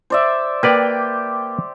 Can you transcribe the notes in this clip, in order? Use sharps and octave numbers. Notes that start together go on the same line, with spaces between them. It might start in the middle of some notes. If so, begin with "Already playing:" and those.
C5 D5 E5
A#3 G4 B4 D5 G5